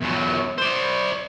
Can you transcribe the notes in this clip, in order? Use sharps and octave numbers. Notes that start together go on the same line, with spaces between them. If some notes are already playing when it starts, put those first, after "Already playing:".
E2 F#3
C5 D5